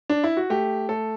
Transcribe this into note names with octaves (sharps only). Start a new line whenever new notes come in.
D4
E4
F#4
A3 G4
A3 A4